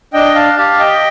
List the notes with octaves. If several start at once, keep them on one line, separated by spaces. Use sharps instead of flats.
D4 D#5 G5
F5 A5
G4 F5 A5
D#5 G5